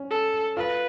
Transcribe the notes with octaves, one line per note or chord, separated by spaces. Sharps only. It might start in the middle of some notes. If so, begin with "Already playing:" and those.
Already playing: C#4
A4
F4 B4